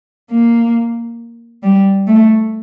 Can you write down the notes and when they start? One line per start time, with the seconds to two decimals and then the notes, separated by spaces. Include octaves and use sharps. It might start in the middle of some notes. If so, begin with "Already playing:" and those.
0.31 A#3
1.63 G3
2.07 A3